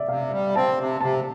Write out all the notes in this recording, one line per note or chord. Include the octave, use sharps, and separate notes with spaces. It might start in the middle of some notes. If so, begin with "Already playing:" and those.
Already playing: D5 E5
C3 F5
G3
C4 A5
C3
C3 A5